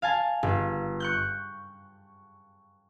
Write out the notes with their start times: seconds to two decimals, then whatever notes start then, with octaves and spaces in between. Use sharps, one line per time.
0.02 F5 G#5 A5
0.43 G1
1.00 C#6 F#6 G6